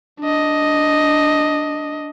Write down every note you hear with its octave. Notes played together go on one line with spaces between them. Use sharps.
D4 D#5